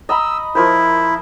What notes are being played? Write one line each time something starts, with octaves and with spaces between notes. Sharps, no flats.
D#5 A#5 B5 E6
F3 E4 A#4 C5